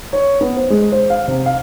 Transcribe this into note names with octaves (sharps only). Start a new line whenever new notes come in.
C#5
B3
C5
G#3
C5
F5
C3
F5